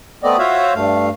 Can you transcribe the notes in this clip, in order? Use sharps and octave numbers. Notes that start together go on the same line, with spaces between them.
A3 B3 C4 D5 D#5
F4 F#4 C5 C#5 E5 F5
G2 A3 F5